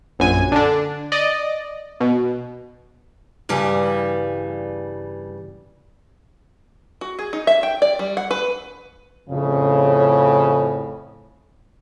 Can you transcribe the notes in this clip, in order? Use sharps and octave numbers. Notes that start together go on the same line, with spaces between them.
A#1 F#2 G#5
D3 D4
D5 D#5
B2
G2 C#3 E3 G3
F#4
G#4
D#4
E5
G5
D5
G3
F#5
B4
F2 A2 C#3